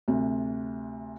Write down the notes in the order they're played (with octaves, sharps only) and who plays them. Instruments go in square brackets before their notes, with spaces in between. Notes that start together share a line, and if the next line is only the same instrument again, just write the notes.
[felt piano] D2 C3